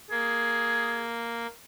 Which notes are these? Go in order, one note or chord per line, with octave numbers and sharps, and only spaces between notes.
A#3 G#4